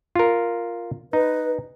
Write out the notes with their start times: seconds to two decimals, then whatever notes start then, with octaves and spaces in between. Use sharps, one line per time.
0.16 F4 A#4
1.13 D#4 B4